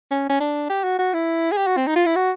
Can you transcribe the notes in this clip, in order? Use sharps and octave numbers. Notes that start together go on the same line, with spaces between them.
C#4
C#4
D4
G4
F#4
F#4
E4
G#4
G4
F#4
C4
D#4
F4
E4
F#4